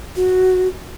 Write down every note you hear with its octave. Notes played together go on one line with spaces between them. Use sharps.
F#4